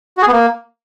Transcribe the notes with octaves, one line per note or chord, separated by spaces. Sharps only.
F#4
G#4
B3
A#3